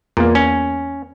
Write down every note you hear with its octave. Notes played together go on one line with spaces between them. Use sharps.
E2 A#2 A#3
C#4